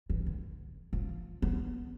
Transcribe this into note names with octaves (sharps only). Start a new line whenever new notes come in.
E3
D3
F3
B3